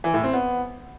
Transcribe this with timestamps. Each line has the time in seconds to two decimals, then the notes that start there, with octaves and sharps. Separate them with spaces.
0.04 E3
0.14 A2
0.24 C4
0.33 B3